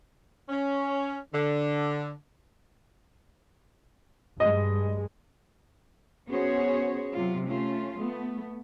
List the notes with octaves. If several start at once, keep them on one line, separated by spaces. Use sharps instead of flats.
C#4
D3
G2 G#3 D#5
B3 C#4 F#4 G#4 C5 C#5
C3 F#3 F4
A3 C#4 F4
A3 B3